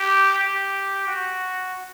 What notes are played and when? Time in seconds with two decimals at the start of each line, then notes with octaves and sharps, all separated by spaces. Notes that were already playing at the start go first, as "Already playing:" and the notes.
Already playing: G4
0.39 G4
1.07 F#4